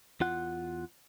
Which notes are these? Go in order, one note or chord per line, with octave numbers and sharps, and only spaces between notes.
E2 F4 F#5